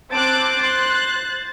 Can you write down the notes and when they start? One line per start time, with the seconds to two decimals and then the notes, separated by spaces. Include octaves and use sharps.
0.12 C4 C5 A5 D6 F#6 A6
0.62 C6 F#6